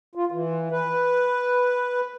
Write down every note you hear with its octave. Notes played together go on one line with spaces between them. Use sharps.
F4
E3
B4